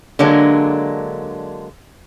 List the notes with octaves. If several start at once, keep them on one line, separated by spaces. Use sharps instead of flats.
D3 F#3 G#3 A#3 D4